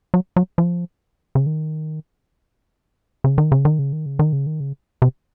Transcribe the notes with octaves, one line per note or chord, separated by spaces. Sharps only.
F#3
F#3
F3
C#3
D#3
C#3
D#3
C#3
D#3
C#3
D#3
C#3
D#3
C#3
D#3
C#3
C3